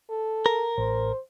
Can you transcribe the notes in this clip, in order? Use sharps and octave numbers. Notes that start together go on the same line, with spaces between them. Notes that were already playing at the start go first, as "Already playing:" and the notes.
A4
A#4
A1 C5